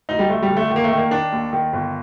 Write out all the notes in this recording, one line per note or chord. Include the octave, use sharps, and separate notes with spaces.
D2 D#4
G3
D2 A3
G3
D3
A3
D#3
A#3
A3
D#3
A#3
D#3 D4
D#2
D#3
G1